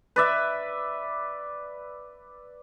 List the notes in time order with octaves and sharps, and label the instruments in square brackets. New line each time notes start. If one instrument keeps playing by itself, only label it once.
[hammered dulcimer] B4 D5 E5